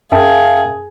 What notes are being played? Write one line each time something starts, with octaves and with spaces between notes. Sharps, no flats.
F#2 G#4 E5 F5 G5 A5